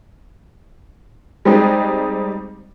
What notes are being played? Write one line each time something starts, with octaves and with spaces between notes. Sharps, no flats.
G3 G#3 C4 D#4